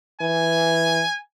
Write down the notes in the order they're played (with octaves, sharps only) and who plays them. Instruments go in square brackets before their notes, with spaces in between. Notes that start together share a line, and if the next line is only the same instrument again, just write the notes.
[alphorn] E3 [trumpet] G#5